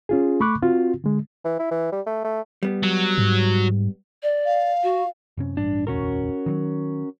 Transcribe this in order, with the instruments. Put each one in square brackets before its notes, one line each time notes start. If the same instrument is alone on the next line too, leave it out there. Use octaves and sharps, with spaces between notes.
[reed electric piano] C#4 F4 G#4
A3 B5 C#6 D6 F#6
C4 F4 F#4
D3 G#3
[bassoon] E3
E4
E3
G3
A3
A3
[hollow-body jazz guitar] G3 B3
[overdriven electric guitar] F#3
[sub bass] G#2
[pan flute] D5
[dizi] F5
[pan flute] F#4
[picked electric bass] F#2 C3 C#4
[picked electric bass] A1 G2 [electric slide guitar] D4
[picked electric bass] F1 A#1 D#2 [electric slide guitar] C#4 F#4 A#4
[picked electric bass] D#3 E3 F#3